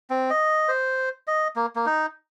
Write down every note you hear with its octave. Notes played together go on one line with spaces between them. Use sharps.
C4
D#5
C5
D#5
A#3
A#3
D#4